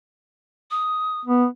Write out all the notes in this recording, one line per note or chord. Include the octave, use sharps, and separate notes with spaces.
D#6
B3